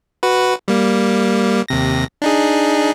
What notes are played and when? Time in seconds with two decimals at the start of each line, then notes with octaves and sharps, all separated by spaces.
0.23 F#4 B4
0.68 G3 A#3
1.68 D#2 C3 A#6
2.22 D4 D#4 G#4